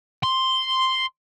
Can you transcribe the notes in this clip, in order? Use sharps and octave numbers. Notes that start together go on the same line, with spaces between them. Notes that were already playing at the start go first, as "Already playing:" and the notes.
C6